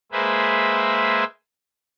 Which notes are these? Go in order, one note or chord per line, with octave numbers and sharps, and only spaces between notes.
G#3 A#3 G#4 B4 C5 E5